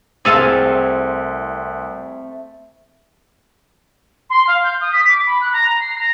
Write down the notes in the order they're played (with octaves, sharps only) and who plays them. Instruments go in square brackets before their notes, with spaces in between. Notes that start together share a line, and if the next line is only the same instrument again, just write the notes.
[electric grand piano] C2 [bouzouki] A3 C4 [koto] G#4 A4 F5
[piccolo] C6
F5
G6
D#6
B6
D6
B5
F#6
A#5
C7
A#5